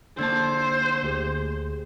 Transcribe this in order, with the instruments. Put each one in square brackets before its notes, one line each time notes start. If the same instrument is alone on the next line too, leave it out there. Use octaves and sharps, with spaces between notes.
[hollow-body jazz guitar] D3 A#3 A5 [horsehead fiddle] C5 [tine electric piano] E6 G#6 A6
[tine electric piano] D2 G4 G#4